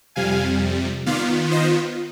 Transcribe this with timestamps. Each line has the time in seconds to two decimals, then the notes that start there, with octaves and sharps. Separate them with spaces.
0.16 F2 C3 G3 F5 G#5
1.06 D#3 B3 F4 D5 F5
1.51 C5 D#5